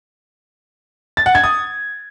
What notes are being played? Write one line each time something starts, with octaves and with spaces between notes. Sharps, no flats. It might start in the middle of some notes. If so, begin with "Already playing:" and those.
A6
F#5
G#6
D#6